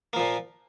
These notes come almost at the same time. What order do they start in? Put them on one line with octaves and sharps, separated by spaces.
A#3 F3 A#2